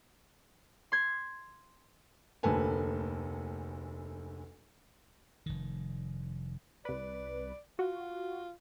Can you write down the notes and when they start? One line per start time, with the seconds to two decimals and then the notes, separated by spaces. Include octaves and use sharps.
0.92 C6 G#6
2.43 F1 D2 A#3 A4 B4 G#5
5.46 F1 D#3
6.85 C2 B4 D5
7.79 F4 F#4